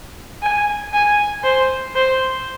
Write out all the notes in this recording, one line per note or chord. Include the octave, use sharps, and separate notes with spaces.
G#5
G#5
C5
C5